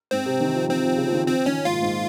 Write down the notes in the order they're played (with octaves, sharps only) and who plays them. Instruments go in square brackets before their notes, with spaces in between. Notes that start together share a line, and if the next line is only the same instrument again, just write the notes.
[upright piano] G#2 [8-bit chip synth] C4
[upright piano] C3
D#3
F3
[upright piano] D#3 [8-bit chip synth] C4
[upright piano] F3
C#3
F3
D#3
[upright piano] F3 [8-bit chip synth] C4
[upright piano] D#3 [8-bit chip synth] C#4
[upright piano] G#2 [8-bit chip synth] F4
[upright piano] A#2
G#2